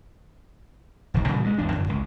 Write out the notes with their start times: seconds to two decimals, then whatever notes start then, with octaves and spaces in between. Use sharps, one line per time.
1.14 D#1 B1 D#3
1.28 A#2 C#3 E3 G3
1.44 G2 G#3
1.58 G#1 E2 D4
1.72 F#2 D3
1.88 G#1 C#2